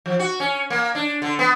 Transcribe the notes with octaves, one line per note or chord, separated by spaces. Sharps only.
F3
F#4
C#4
A#3
D4
D3
B3